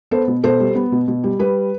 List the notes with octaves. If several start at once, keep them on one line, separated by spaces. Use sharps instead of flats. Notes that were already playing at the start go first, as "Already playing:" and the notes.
B3 A4 C5
B2
B2 A4 C5
G3
B3
B2
B2
G3
G3 B4